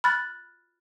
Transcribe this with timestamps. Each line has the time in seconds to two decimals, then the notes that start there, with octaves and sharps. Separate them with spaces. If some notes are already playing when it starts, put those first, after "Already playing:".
0.04 B5 F6 F#6 A6